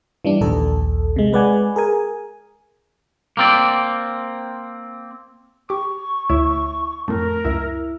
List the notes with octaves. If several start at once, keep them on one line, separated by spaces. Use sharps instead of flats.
E3 G3 D4
A#1 D#2 A#2 A4
C3 G#3
G#3 B4 D5 F#5 G#5
G#4 A#4 G#5
A#3 C4 D5
G4 C#6 D6
D2 E4 C#5
F2 A2 A3 A#4
C#2 F#2 E4 E5